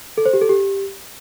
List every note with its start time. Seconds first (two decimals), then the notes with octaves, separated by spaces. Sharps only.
0.18 A4
0.25 C5
0.33 G4
0.41 A4
0.49 G4